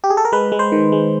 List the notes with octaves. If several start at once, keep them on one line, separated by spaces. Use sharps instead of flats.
G4
G#4
A4
A#4
G#3 B4
G#3
C5
D#3
G#3